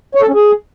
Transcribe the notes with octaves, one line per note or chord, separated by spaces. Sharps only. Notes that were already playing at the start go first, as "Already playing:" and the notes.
C#5
A4
C#4
G#4